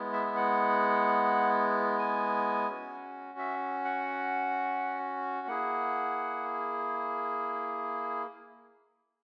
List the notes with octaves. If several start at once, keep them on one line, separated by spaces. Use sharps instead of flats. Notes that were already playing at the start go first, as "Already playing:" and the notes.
Already playing: G#3 B3 E4
E5
E5
F#5
G#5
C#4 F#4
E5
F#5
A#3 E4 G#4 F#5